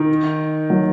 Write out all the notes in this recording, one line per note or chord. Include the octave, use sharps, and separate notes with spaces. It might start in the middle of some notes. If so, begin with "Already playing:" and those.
Already playing: D#3
F#3